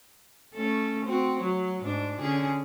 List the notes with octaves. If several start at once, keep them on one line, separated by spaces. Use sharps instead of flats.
A3 C#4 A4
C4 F#4
F#3
G#2 D4
D3 C#4 G#4